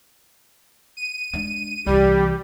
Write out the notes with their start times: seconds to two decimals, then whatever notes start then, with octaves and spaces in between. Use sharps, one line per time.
0.97 D#7
1.34 G#3 D4
1.86 C2 E3 G3 G4